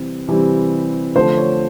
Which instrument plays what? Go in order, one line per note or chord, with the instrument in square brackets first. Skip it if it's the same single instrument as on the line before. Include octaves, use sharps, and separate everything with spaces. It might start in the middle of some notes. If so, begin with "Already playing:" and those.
Already playing: [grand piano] C3 E3 G3 C4
C3 E3 G3 C4
[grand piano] D3 F3 A3 [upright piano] C5
[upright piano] C#5